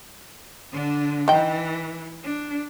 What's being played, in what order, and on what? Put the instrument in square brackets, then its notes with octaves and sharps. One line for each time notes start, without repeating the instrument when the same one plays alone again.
[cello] D3 D4
[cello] E3 [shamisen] D#4 G5
[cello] D4